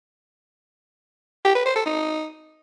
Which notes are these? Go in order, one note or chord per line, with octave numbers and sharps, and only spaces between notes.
G4
B4
C5
A4
D#4